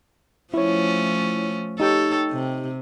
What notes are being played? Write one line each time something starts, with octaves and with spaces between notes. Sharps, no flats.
F3 A3 C#4 E4 C#5
D#4 G4 A4 C#5 G5
C3